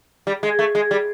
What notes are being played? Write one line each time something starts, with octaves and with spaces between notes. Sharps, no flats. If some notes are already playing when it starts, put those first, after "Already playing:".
G3
G#3
A3
G#3
G3